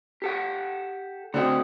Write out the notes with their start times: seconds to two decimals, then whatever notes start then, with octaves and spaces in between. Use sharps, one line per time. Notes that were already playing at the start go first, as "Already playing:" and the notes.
0.22 G4 A4 F#5
1.34 D3 A3 C4 F#4 D#5